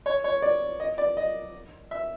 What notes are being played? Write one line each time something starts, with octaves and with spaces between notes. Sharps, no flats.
C#5
C#5
D5
D#5
D5
D#5
E5